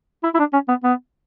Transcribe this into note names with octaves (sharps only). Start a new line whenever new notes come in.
E4
E4
D4
C#4
B3
B3